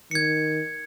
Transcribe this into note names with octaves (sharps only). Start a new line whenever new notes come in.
D#3 G#6 C#7